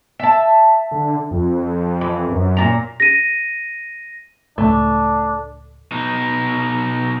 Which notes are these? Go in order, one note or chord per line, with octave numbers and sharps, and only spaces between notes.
E5 A5
D3
F2
E3
F#2
A#2 A#5
A#6 D#7
C#2 A2 A3 D4
B2 D#4